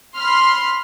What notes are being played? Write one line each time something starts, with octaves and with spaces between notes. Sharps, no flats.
B5 C6 F6